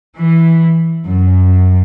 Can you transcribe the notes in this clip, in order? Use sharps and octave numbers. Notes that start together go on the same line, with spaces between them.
E3
F#2